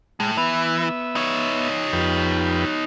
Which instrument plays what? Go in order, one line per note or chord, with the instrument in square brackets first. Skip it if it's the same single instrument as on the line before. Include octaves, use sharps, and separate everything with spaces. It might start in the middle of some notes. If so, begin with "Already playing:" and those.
[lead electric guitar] A2 [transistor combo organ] G#3
[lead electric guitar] E3 [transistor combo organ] B3 E5
[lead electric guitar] D#4 C#5
[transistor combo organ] F2 G4 B4